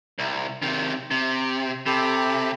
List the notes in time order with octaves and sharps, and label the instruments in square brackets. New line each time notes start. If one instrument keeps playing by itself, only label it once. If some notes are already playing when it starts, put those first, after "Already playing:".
[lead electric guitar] C2
C3 D#3
C3
[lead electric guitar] C3 [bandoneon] G4 A4 B5